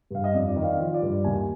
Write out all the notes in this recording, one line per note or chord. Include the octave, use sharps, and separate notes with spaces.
G2 F5
D#5
F2 D5
D5
D#3
F5
F3
D5
G2
D#2 G#5